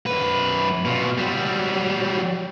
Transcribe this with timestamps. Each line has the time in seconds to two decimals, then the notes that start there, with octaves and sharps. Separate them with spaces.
0.06 F#2 B4
0.85 B2 F4
1.18 F#3 G3